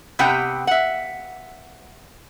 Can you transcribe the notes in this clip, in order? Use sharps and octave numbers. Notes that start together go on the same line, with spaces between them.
C3 B3 G4 F#5 G5
E5 F#5